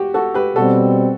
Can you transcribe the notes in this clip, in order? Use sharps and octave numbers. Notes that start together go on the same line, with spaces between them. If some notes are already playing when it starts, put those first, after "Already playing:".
Already playing: F#4 G4
F#4 A4
G4 B4
B2 G3 C4 F#4 A4